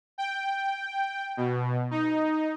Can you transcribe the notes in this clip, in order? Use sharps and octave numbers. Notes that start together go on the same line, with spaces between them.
G5
B2
D#4